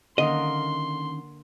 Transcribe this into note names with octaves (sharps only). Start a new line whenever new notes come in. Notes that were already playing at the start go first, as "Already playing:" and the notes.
D3 D#3 A#3 C#4 A#4 D#5 C6